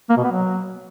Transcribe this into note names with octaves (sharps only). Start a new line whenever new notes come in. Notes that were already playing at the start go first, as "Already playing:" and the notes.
A#3
B2
B3
F#3